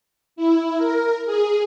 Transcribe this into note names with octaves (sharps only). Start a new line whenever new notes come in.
E4
A#4
G#4